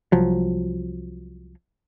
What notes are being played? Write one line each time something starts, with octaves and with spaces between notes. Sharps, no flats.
C2 F3 F#3